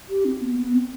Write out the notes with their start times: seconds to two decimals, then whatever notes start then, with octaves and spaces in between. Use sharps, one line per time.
0.09 G4
0.25 C4
0.41 B3
0.56 B3
0.73 C4